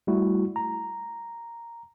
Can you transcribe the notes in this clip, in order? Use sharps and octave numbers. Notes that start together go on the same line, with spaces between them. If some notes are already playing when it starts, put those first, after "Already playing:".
G3 A3 E4 F#4
A#5